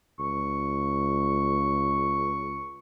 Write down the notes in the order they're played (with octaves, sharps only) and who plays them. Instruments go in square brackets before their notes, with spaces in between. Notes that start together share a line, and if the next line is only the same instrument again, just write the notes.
[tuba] C#2 [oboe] C#6